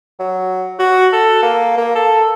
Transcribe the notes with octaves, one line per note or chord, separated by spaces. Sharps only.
F#3
F#4
A4
A#3
A#3
A4